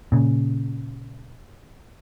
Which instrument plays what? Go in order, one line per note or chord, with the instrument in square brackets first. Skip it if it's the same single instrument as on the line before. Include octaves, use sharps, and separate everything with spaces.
[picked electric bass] A#2 C#3